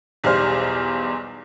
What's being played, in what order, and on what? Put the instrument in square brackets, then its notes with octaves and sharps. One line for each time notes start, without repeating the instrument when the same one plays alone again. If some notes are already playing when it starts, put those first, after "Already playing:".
[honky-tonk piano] B1 E2 G3 C5 F6